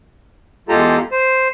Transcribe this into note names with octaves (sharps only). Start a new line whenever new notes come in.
E2 G#3 F4 G4 A4 A#5
C5